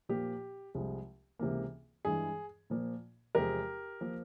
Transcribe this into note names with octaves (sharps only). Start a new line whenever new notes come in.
A#2 F3 A#3 G4
C2 C3 F3 G#3
C#2 C3 E3 A#3
G2 E3 G#3 G#4
A#2 F3 A#3
E2 C3 F3 G#3 G4 A#4
F3 A#3